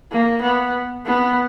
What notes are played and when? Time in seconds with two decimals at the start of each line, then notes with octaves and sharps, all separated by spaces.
0.12 A#3
0.42 B3
1.06 B3